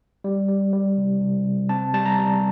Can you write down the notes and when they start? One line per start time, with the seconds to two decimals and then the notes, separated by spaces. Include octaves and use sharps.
0.24 G3
0.48 G3
0.73 G3
0.97 C3
1.21 C3
1.45 C3
1.69 C4 A5
1.94 G3 A5
2.06 A#5
2.19 G3